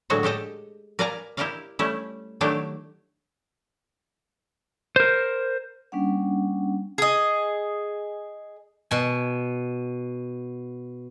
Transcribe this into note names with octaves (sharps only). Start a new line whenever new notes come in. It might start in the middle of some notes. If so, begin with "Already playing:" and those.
A2 D3 F#3 G#3 F#4 F#5
G#3 G4 A4 D#5
A#4 B4 D5 F5 G#5 A#5
E4 G4 A#4 D5 D#5 F5
G3 A3 C#4 E4
D#3 F#3 A3 D4 E4 G4
A#4 C5
G3 A#3 C#4 D4 F#5
G#4 D#5
B2 G#5